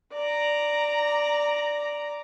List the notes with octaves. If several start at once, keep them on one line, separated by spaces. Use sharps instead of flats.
D5 A#5